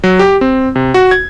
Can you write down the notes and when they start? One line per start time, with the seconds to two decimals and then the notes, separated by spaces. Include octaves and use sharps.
0.04 F#3
0.19 G4
0.41 C4
0.76 C3
0.94 F#4
1.11 G#6